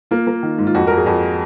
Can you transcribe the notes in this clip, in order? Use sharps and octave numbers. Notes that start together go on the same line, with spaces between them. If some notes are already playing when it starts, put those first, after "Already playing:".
A#3 F4
A#3
D#3
G#2
F4
F2 F#4
F2 A#4
G#4
F2 F#4